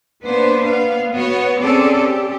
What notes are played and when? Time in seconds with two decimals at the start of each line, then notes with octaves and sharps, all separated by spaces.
0.23 A#3 B3 D4 B4 C5
0.69 B3 F5
1.14 B3 F#4 C#5
1.62 C4 C#4 G#4 A4 D5
2.00 G4